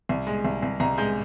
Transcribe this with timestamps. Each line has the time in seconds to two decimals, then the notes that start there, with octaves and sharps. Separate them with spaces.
0.09 C2
0.27 G#3
0.45 C2
0.62 C2
0.80 C2 A#5
0.98 G#3 G6